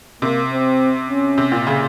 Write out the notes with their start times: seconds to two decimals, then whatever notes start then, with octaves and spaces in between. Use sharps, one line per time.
0.22 C3 A#3
0.51 C4
1.09 C#4
1.38 C3
1.52 A#2
1.67 C#3